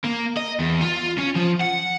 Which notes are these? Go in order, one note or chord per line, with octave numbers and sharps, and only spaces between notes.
A#3
D#5
E2
F4
C#4
F3
F#5